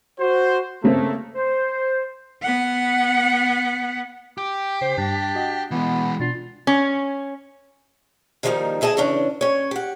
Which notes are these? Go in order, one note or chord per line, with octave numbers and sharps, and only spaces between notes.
F#4 C5
C#3 A3 A#3 C4
C5
B3 F#5
G4 D6
C#3 C5
G2 G3 D4
F#4 D#5 F#5
E3 G#3 B3
B2 D4 F4 C7
C#4
D3 D#3 F3 G3 A#3 D#4
D2 E4 G#4 D#5 A5
C#3 E3 C#4 D4
C#4 C#5
G4 F#5